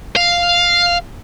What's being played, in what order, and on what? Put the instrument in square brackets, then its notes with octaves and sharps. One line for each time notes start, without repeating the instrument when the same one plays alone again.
[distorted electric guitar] F5